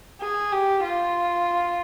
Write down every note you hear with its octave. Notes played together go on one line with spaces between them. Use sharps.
G#4
G4
F4